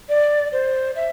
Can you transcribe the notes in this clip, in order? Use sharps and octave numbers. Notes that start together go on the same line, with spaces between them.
D5
C5
E5